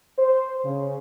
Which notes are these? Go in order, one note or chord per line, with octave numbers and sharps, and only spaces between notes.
C5
C#3